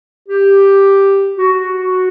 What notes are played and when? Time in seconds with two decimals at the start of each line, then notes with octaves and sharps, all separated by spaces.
0.28 G4
1.38 F#4